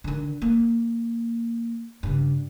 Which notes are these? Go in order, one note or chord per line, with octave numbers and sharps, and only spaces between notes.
D3 D#3
A#3
G2 C#3